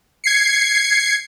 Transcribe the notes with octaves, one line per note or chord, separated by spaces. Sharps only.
G#6 C7 C#7